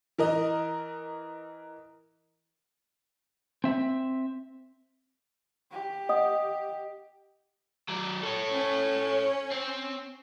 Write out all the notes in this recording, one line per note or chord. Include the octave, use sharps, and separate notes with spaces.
E3 A#4 D#5
C4 E5
G4
D#5 F#5 D#6
F#3 D5
A4 C#5
C#4
C4